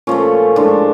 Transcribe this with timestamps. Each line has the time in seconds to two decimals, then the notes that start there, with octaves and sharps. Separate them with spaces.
0.07 A#2 F3 A3 C#4
0.56 A2 F3 G#3 D4